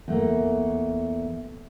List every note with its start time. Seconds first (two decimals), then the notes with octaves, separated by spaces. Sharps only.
0.08 E2 A3 A#3